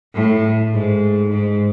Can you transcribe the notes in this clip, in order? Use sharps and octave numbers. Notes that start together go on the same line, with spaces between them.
A2
G#2
G#2